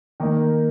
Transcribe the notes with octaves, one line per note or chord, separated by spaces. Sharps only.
D#3 A#3 D#4